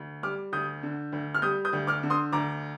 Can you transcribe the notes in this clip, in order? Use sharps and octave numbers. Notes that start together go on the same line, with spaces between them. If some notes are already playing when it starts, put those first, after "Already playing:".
Already playing: D2
G3 D6 F6
D2 D#6 G6
D3
D2
F6
G3 D#6 G6
D#6 G6
D2
D6 F6
D3
C6 D#6
D2 A#5 D6